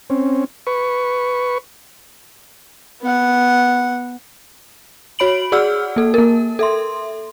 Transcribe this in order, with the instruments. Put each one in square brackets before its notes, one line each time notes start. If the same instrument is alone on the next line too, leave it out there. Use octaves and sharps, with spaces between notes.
[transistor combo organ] C4 C#4
B4 C#6
[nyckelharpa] B3 F#5
[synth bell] F#4 C#5 B5 D7 F#7
F#4 G#4 D5 F#5 E6 F6
A#3 A4
A#3 A#4
A4 E5 C6